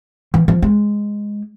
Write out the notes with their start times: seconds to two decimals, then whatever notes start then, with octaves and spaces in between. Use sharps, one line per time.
0.34 E3
0.48 F3
0.62 G#3